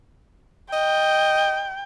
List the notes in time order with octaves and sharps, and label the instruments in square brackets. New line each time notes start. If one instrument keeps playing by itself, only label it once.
[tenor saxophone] D#5 [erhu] G5